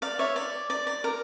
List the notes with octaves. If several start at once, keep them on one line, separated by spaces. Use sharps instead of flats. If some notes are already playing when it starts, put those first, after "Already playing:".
D5 F5
C#5 E5
D5
D5
D5
A#4